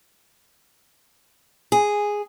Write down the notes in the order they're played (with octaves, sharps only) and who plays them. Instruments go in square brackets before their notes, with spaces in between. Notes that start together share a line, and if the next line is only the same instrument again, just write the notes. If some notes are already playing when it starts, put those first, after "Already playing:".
[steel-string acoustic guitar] G#4